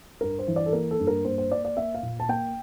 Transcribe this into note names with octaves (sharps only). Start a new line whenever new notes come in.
G2 A#4
C5
E3
D5
A4
A#3 A#4
A4
G2
A#4
A#3 C5
C5
A#3 D5
D5
A#3 E5
F5
A#2
A5
A#3 G5